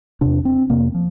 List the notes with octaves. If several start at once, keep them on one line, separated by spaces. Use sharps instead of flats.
E2 C3 D4
C4
F2 C3 A#3
F3